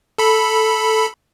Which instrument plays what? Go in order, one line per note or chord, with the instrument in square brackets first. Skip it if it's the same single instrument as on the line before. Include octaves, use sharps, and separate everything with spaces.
[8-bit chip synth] A4 B5